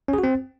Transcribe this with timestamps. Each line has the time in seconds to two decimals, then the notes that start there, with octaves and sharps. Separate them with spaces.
0.08 C#4
0.13 G#4
0.18 F#4
0.24 C4